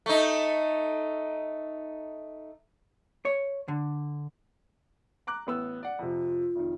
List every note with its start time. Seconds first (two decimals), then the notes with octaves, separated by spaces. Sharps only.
0.06 A3 D#4
3.25 C#5
3.68 D3
5.27 A#5 D6 F#6
5.47 A1 B3 E6
5.83 D5 F#5
5.99 F2 C3 F4
6.56 F1 D#3